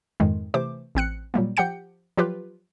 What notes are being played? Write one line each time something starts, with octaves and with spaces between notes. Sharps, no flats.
F2 G#2 D#3 G#3
C3 E3 A3 C5 D6
A1 C4 F#6 C#7
A#2 F#3 G3 A#3
F3 G4 F#5 G5 G6 C#7
F3 F#3 F4 G4 B4